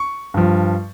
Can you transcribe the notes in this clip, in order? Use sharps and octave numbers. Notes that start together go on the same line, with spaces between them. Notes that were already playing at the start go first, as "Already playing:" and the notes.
Already playing: C#6
G2 F3